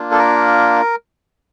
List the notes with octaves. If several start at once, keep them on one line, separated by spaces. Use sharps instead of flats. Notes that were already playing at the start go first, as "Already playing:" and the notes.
Already playing: A#3 D4 F4
A4
A#4